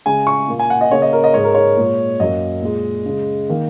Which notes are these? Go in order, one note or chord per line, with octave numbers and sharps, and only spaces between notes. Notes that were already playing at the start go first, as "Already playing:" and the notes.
C#3 G#3 G#5
C#6
A#2 A#3
G#5
F#5
D#5
C#3 A#3 C#5
D#5
A#4
D#5
G#2 G#3 C#5
A#4
C#5
A#2 G#3
F#2 F#3 A#3 D#5
A#2 G#3
C#3 G#3
D#3 A#3